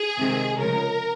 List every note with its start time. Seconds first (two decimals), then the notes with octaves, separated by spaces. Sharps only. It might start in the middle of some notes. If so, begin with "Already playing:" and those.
Already playing: G#4
0.18 C3 D#3 G#3 C4
0.57 C#3 F3 G#3 C#4 A#4